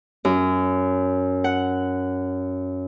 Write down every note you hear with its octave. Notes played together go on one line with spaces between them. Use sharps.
F#2
F#5